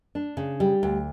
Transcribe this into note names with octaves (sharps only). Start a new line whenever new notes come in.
D4
C#3
G3
D2